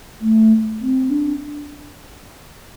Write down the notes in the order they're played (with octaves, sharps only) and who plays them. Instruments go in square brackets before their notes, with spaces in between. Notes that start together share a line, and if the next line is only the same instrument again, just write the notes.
[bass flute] A3
C4
D4